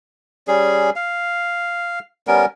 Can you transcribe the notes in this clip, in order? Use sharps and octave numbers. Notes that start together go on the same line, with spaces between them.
G3 C#4 G#4
F5
G3 B3 C#4 A#4